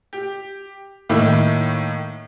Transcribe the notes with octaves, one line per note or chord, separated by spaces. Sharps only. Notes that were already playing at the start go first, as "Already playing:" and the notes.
G4
A2 D#3 A#3 E4